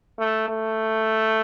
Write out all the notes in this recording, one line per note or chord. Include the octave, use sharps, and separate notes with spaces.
A3
A3